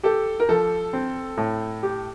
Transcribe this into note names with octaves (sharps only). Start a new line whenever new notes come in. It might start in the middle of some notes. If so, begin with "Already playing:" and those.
G4 A4
A#4
F3 A4
C4
A2
G4